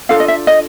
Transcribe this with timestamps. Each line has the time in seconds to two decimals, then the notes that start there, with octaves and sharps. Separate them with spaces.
0.09 D4 F4 A4 F5
0.20 D#5
0.28 E5
0.47 D#5